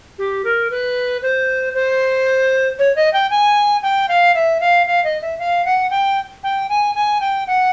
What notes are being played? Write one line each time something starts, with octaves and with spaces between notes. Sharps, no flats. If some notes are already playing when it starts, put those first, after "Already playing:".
G4
A#4
B4
C5
C5
C#5
D#5
G5
G#5
G5
F5
E5
F5
F5
D#5
E5
F5
F#5
G5
G5
G#5
G#5
G5
F#5